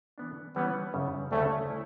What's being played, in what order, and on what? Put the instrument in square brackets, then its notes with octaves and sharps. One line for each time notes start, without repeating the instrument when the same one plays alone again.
[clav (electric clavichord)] E3 B3 D4
[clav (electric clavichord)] E3 G3 C#4 [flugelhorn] B3
[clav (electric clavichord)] F#2 C#3 G3
[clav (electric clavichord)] D2 C#3 G3 C#4 [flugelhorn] A3
[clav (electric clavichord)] E4